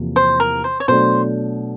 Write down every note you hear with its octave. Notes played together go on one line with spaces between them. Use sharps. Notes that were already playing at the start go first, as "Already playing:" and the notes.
Already playing: E2 C3 F3 A#3
C5
A#4
C5
C#5
B2 F#3 A3 D4 C5